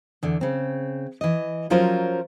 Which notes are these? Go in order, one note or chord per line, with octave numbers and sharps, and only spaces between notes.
E2 D3
C#3 C4
E3 D#5
F3 F#3 C#4 F4 A#4 C5